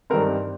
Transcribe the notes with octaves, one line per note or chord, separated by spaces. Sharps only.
G2 D#3 G3 C4 A#4